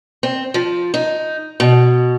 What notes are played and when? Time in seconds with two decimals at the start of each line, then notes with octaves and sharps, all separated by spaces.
0.23 C4
0.54 F3
0.94 D#4
1.60 B2